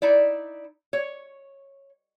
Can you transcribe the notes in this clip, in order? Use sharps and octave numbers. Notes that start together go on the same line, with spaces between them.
D#4 E4 D5
C#5